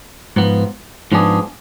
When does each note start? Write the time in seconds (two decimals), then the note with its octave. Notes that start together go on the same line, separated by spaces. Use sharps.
0.36 G#2 F3 B3
1.12 G#2 F3 B3 D4 G#4